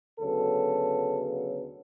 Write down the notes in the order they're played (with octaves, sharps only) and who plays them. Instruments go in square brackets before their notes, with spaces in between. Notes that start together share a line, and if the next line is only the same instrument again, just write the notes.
[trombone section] D2 C#3 F#3 B3 A4